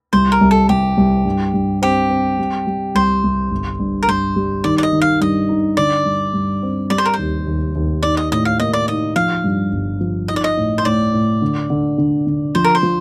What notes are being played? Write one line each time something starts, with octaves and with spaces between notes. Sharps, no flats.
C2 C5
A#4
C2
A4
C2 G4
C2
G2
G2
C4 G4
C4
G3
G3
C2 C5
C2
G1
G2
A#4
G2 C5
G3
D#3 D5
D5
D#5
D#3
F5
G2 D#5
D#4
D3 D5
G2
G2
C4
G3 D5
C5
A#4
D#2 C5
D#2
D#2
D#4 D5
D#5
A2 D#5
F5
A#3 D#5
D5
D#4 D#5
F3 F5
G2
G1
F3
D#4 D#5
D5
D#5
A2
C5
A2 D5
A2
D3
D3
D3
D3
F3 C5
A#4
C5
F3